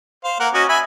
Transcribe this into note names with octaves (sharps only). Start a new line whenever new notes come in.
C5 F5
A#3 A#4 F#5
C#4 F#4 D#5
E5 G#5 B5